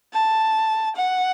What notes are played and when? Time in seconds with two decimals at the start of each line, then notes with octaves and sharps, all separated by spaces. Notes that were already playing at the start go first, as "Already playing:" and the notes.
0.14 A5
0.96 F#5